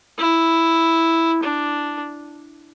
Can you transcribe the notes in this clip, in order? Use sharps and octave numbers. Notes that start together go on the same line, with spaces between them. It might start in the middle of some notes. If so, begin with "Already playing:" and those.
E4
D4